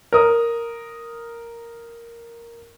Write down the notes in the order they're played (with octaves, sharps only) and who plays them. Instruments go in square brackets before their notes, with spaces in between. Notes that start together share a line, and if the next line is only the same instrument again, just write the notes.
[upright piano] A#4 D#6